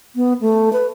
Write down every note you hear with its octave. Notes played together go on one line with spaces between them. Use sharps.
B3
A3
B4